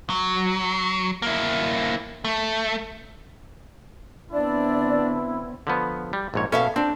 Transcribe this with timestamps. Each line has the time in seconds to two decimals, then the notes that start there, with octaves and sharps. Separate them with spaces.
0.10 F#3
1.22 A#3 E4
2.24 A3
4.32 D3 B3 C4 D4 E4 D5
5.67 D3 F3 B3
6.13 G3
6.34 A#1 G#2 C#5
6.52 B2 C#4 A4 E5 F5
6.76 C4 D4